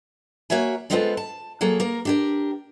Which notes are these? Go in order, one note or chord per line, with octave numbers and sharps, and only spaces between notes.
A#3 F#4 C#5 E5 G#5
G3 G#3 B3 C4 F4 A4
A5
F#3 A#3 G#4 A4
A#3 A#4
D4 G4 A#4